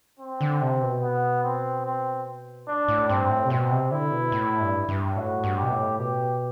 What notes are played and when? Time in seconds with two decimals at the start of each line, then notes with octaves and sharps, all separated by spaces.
0.20 C4
0.41 D3
0.61 C3
0.82 B2
1.02 B3
1.44 C4
1.85 C4
2.67 A2 D4
2.88 A2
3.09 G2 C4
3.30 A2
3.45 C3
3.50 B2 C4
3.71 C3
3.91 D3 E4
4.12 B2
4.32 A2
4.61 G2
4.89 G2
5.16 A2 F#4
5.44 G2
5.57 G4
5.63 B2
5.71 A2
5.98 B2 G4